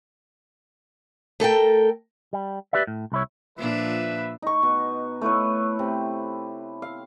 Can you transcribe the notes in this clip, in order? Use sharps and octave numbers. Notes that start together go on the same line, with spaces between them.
A3 A4 A#4 G5
G3
G4 B4 D5 E5
A2
C2 E4 C#5
A#2 F3 D4 B4 E5
D#4 C#6
B2
A3 E4 B4 C#5
C3
F5